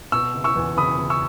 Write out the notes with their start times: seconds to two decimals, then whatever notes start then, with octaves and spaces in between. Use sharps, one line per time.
0.12 B2 C#6 E6
0.34 F#1
0.44 C#6 E6
0.56 E2
0.77 F#1 B5 D#6
0.98 F#1
1.10 C#6 E6